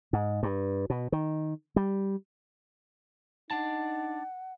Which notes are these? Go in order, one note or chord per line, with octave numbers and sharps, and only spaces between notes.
G#2
G2
B2
D#3
G3
D4 D#4 F#5 A5